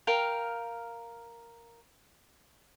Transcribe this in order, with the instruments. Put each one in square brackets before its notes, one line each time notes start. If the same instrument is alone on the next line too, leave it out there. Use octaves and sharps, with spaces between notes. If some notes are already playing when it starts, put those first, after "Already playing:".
[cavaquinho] A#4 F5 G5